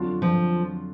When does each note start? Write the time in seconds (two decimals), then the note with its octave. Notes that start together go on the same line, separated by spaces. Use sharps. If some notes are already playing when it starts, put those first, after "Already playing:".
Already playing: F2 D3 F#3 D4 F4
0.22 F3